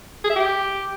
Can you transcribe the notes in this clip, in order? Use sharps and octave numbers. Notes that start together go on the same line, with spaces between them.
G#4
E5
G4